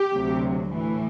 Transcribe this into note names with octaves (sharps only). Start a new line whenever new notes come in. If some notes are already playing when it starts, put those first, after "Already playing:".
Already playing: G4
D2 C3 F#3
A2 E3